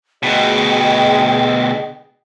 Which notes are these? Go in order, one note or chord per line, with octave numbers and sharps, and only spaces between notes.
D2 B2 G#4 D#5 G5